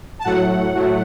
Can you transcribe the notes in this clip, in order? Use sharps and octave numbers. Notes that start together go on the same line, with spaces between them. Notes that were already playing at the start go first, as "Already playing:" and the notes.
A5
A2 F#3 A3 F#5
A2 F#3 A3